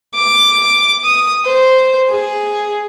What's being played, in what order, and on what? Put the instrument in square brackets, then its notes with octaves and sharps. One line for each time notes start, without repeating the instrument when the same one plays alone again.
[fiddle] D6
D#6
C5
G#4